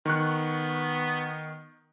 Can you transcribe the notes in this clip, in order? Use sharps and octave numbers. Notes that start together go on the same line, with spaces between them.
D#3 B3 C#6 F#6